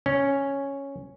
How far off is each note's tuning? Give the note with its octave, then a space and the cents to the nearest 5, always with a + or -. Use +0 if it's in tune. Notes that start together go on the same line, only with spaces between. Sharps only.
C#4 +0